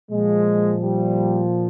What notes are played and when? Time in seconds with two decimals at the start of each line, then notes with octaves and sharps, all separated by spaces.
0.11 A#2 F3 G#3
0.82 G3